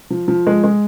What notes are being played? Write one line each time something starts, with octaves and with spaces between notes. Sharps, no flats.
F3
F3
G#3
G#3